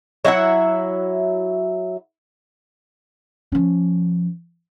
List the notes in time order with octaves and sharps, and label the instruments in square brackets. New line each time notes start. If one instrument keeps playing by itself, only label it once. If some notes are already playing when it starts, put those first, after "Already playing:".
[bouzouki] F#3 E4 E5 F#5
[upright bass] F3 C#4